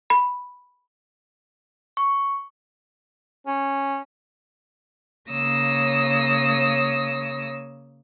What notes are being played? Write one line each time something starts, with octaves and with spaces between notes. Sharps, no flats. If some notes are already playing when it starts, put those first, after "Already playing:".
B5
C#6
C#4
C#3 A#3 C#5 D#6 E6 A#6